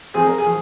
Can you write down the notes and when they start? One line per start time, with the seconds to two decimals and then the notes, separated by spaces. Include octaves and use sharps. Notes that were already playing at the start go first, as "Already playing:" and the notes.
0.14 F3 C4 G#4
0.27 A#4
0.38 G#4
0.46 F3